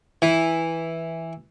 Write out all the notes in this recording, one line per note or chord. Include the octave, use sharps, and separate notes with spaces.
E3